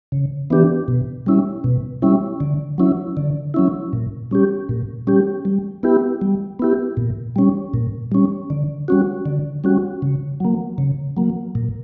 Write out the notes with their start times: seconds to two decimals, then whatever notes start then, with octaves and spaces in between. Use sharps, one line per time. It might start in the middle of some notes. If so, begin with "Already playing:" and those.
0.12 C#3
0.50 E3 B3 D4 G4
0.88 B2
1.26 G3 C#4 E4
1.64 B2
2.02 G3 C#4 E4
2.40 D3
2.78 F#3 C#4 E4
3.17 D3
3.54 F#3 C#4 E4
3.93 A#2
4.31 G3 C#4 G4
4.69 A#2
5.07 G3 C#4 G4
5.45 G3
5.83 B3 E4 G4
6.21 G3
6.59 B3 E4 G4
6.97 A#2
7.36 G3 C#4
7.74 A#2
8.12 G3 C#4
8.50 D3
8.88 G3 C#4 F#4
9.26 D3
9.64 G3 C#4 F#4
10.02 C#3
10.40 F#3 A#3
10.78 C#3
11.17 F#3 A#3
11.55 A#2